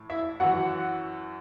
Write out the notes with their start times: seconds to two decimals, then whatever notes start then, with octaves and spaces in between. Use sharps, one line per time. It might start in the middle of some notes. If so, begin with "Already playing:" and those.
Already playing: A2 E3
0.10 E4 E5
0.40 F#2 E3 F#4 F#5